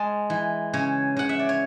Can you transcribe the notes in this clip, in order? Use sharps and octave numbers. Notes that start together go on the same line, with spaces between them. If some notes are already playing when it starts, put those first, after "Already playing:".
Already playing: G#3 A5
E3
C#3 C#5
C#3 F#5
E5
D5
C#5